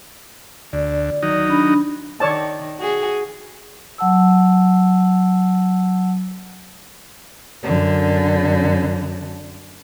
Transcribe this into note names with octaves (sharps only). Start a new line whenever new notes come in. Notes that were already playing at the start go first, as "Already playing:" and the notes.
D2 D5
D#3 F#3 D#4
D4 B5
D#3 C#5 D5 A5
F#4 G#4
F#3 F#5 A5 E6
F#2 D3